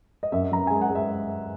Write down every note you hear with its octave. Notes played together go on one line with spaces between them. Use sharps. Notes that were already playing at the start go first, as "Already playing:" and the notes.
D#5
F#2 E5
F#2 A#5
G#3 G#5
F#5
G#3
E5